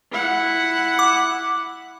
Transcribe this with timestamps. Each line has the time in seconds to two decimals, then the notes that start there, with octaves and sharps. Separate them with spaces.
0.12 E4 F#5
0.99 D6